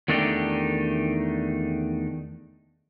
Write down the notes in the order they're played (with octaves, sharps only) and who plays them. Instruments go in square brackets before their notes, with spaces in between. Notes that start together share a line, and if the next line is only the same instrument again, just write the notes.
[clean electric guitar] E2 D#3 A3 D4 D#4 G4